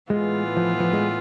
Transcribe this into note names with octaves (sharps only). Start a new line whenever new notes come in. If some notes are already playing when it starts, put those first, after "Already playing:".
A2 E3 G#3 B3 F4
F3
F3
G#3